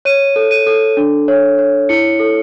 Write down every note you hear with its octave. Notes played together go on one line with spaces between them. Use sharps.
C#5 D#7
A4
D#7
A4
D4
C#5
C#5
E4 C#7
A4